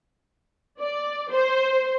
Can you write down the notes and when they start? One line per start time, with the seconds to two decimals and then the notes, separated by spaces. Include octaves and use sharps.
0.79 D5
1.30 C5